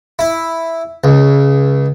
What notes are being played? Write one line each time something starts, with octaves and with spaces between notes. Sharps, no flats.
E4
C#2